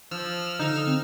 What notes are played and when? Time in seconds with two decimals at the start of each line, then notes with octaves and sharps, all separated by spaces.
0.11 F3 E6 F6
0.59 D3 D#4
0.87 C4